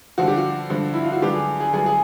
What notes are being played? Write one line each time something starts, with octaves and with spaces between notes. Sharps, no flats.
G2 D3 F3 F#4
G4
F#4
G2 D3 F3
E4
F4
F#4
G2 D3 F#3 B3 G4
G#4
G#4
G2 D3 F#3 B3 G#4
G#4